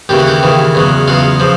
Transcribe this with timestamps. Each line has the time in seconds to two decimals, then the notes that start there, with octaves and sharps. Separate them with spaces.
0.09 D#2 C#3 E3 G4
0.19 F#4
0.27 G4
0.43 D#2 C#3 E3
0.75 E2 C#3 F#3
1.08 E2 C#3 F#3 F4
1.40 C#3 F3